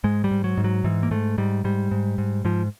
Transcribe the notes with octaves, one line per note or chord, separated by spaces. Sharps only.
G#2 G#3
G3
G#2
F#3
G#2
F#3
G#2 E3
A#3
G#2 A3
G#2 G3
G#2 G3
G#2
G#2
G#2 F3